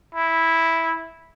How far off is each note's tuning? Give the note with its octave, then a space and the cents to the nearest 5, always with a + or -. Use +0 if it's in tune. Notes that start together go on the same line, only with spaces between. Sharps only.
E4 -5